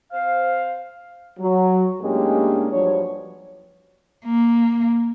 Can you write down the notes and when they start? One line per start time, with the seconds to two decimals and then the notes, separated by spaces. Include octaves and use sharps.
0.11 C4 C5 F5
1.39 F#3
2.01 A2 G#3 A#3 C#4 D4 G4
2.71 G2 F3 F#3 D4 C#5
4.25 A#3